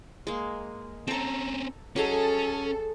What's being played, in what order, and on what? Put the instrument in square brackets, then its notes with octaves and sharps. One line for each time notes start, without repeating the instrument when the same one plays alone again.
[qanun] G#3 A#3
[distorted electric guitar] C4 C#4 [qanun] A4 A#5
[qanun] F#3 G#4 D#5 [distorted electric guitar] C#4 [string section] A4